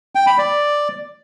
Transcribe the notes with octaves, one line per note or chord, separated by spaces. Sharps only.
G5
B5
D5